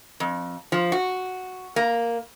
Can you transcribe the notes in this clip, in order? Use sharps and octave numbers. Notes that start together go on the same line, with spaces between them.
F2
F3
F#4
A#3